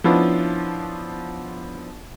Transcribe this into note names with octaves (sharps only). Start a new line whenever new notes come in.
F3 B3 C#4 D4 E4 F4